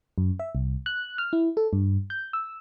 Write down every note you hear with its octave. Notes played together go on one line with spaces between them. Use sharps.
F#2
E5
C2
F#6
F6
E4
A4
G2
G6
E6